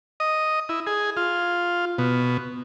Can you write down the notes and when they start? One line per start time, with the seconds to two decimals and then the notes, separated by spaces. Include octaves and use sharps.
0.20 D#5
0.69 E4
0.87 G#4
1.17 F4
1.98 B2